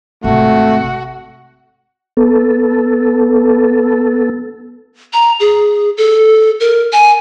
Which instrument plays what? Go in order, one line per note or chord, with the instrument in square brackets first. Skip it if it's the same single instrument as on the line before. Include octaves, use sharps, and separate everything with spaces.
[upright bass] G#1 C3 [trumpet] A3 [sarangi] F#4
[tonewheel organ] B3 A4
[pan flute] A#5
G#4
A4
A#4
G#5